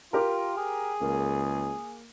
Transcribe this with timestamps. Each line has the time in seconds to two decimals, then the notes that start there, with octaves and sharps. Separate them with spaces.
0.13 F4 G4 A#4
0.57 G#4
1.01 C#2 A#3